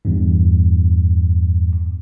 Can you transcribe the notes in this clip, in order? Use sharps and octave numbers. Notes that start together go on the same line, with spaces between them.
E2 G2